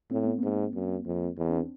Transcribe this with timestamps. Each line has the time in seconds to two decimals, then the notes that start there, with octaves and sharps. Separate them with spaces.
0.11 A2 C4
0.25 B3
0.38 G#2 A#3 C4
0.74 F#2
1.06 F2
1.38 E2
1.49 C#4
1.54 C4 D4